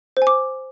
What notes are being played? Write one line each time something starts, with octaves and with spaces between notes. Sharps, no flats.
C5
G#5
D6